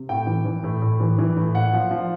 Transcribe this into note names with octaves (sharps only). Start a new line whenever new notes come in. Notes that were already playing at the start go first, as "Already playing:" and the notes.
Already playing: C3
A2 G5
E3
E3
A2
A2
E3
E3
A2
A#2 F#5
F3
F3